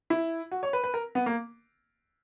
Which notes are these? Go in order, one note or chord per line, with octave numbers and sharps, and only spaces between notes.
E4
F#4
C#5
B4
B4
A#4
B3
A#3